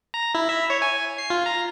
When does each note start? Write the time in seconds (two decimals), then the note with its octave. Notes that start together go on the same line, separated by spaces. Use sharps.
0.14 A#5
0.35 E4
0.49 E5
0.70 C#5
0.82 G#5
1.18 C7
1.30 F4
1.46 A#5